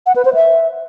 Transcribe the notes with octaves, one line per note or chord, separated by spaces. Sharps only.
F#5
B4
C5
E5